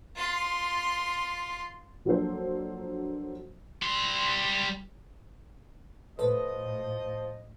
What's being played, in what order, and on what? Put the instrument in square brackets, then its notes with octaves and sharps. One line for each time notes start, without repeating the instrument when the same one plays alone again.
[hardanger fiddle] F4 C6
[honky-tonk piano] F3 F#3 A#3 D4 A4 C5
[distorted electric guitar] G3 C6
[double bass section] A2 [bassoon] F3 [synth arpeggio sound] A4 B4 [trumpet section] D#5